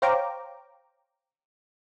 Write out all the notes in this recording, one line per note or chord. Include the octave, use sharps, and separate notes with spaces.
C5 C#5 F5 G5 A#5 D6